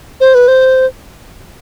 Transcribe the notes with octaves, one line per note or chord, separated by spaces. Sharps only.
C5
B4
C5